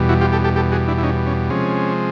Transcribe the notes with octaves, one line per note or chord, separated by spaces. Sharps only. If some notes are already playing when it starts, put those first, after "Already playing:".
Already playing: E2 B2 G3
E4 F#4
F4 G4
G4 A4
G4 A4
G4 A4
F#4 G#4
D4 E4
E4
C#4 D#4
C#4
C3 F3 G#3 C#4